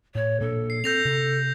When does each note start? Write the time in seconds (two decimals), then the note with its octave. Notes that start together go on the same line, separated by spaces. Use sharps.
0.15 A2 C#5
0.40 A#2 A#3 D4 A4
0.70 C7
0.84 C4 A4 G6 A#6 F7
1.05 C3